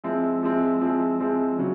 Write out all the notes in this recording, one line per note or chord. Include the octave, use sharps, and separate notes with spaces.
F3 G#3 C4 E4
F3 G#3 C4 E4
F3 G#3 C4 E4
F3 G#3 C4 E4
C#3 F#3